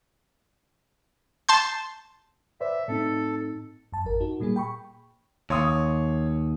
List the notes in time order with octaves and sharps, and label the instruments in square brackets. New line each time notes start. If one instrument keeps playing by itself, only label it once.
[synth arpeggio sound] A5 C6 G6
[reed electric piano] B4 C5 D5 [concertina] E5
[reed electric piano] A2 C4 D#4 [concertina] A4
[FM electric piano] F#2 A5
G#1 F2 A#4
D#4 F#4
A#2 G3 A#3 G#4
G5 B5 C#6
[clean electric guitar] D#2 [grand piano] C#5 C6 D#6